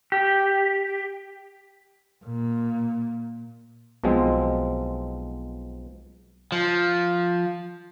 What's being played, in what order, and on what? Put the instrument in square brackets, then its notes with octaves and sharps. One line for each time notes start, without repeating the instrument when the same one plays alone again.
[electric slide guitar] G4
[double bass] A#2
[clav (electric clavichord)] B1 B2 F3 G#3 C4
[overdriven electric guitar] F3